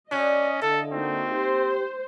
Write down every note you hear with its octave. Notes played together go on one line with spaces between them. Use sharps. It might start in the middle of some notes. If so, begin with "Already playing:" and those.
C#4 D4 F#4 D#5
D3 E4 A4 E5 F5
A#3 C4 D#4 F#4
G4 C5